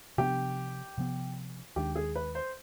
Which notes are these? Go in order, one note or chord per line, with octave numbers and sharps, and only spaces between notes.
C3 F3 B3 D4 G4
C3 F3 B3
D#2 D#3 G#3 D4 G4
G#4
B4
C5